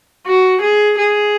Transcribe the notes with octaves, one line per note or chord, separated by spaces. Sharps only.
F#4
G#4
G#4